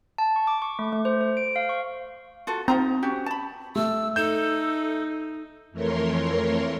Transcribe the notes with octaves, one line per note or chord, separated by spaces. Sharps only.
A5
C#6
D6
C#6
A3
A3
C5
C5
D7
F5
C#6
F4 F#4 A4
C4 D#4 F4 A#5
C#4 F#4 G4
A5 B5
A3 E6
D#4 A4 G6 E7
F2 E3 A3 A#4 C#5 C6